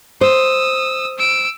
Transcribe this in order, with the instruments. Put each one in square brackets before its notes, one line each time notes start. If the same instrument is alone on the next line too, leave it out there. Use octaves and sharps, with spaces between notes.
[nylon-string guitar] C5 [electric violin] D#6 E6
[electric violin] E6 D7